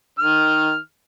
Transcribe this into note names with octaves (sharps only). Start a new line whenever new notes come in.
D#3 F6